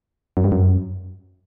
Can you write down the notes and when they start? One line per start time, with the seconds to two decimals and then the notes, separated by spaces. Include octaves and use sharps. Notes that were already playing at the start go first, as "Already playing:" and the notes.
0.37 F#2
0.44 G2
0.52 F#2